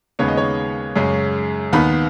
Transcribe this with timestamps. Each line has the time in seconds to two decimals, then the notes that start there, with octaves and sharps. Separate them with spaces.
0.19 D#2 C#3 G#3 B3 C#5
0.28 D#5
0.37 C#5
0.96 F#2 C#3 G#3 C#4
1.73 D#2 D#3 B3 B5